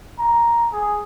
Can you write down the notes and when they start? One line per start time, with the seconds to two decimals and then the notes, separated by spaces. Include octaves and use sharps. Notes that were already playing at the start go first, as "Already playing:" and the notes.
0.19 A#5
0.73 G#4